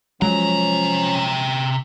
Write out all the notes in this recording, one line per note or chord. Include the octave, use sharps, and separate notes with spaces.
C3 F3 F#3 G#3 C#4 A#5